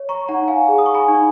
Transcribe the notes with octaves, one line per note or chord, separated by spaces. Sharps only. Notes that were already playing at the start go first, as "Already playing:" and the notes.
Already playing: C#5
A#5 C#6
D#4 F#5 A#5
F5 G#5
G#4
D#6
C#6
G#5 B5
D#4